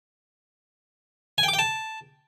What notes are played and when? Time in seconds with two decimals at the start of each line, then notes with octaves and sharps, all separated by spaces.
1.38 G#5
1.43 G5
1.48 D6
1.54 G5
1.59 A5